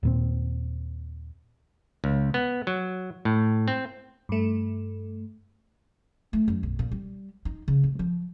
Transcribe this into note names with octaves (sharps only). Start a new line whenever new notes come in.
D#2 A#2 C4
C#2
B3
F#3
A2
C4
G2 A3
A3
F#2
B1
A#2
G3
D#4
C#3
A1
F3